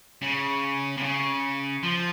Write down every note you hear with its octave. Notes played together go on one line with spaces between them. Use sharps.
C#3
C3
C#3
F3